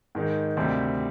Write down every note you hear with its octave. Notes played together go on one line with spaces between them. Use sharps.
G#2 D#3 G#3
D2 C3 D#3 G3 C4